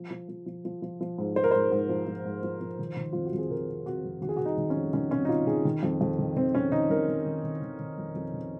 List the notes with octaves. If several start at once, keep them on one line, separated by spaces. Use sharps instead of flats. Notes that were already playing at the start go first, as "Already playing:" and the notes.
Already playing: F3
F3
F3
F3
F3
F3
F3
G#2
F3 C5
A#4
G#2 C5
G#2
F3
F3
G#2
F3
F3
D#3
D#3
F2 F4
F#4
F2
G#4
D#3 A#4
C3
C3 F#4
F2
D#3 F#4
G#4
D#3 F#4
D#4
D#3
C#4
F2
D#3 C#4
C3 C#4
D#4
C3 F4
D#3 G#4
D#3
F2
F2
D#3
D#3 C4
F2 C#4
D#3 D#4
F2 A#4
F2
D#3
D#3
D#3
D#3
F2
F2
D#3